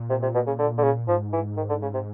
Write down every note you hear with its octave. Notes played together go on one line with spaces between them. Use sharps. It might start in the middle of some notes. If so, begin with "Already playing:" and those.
Already playing: A#2
C3
C3
B2
C#3
D3
D3
C#3
G#2 F3
E3
D#3
D3
C#3
C3